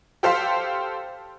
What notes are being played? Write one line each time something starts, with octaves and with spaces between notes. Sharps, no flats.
G4 A4 C5 F5 C6 B6